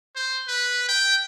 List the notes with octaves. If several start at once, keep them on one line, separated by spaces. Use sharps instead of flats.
C5
B4
G5